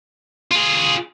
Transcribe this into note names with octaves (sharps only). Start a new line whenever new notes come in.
F4 G#4